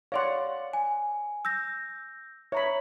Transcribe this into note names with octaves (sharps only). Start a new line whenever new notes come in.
C#5 D5 F5 F#5 C6
G#5
E6 G6 A#6
C#5 E5 A#5 B5